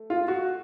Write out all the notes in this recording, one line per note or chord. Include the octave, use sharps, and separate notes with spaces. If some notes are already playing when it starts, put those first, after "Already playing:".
Already playing: A3
F4
F#4